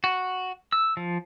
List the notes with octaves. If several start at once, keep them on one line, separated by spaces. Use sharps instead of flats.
F#4
E6
F3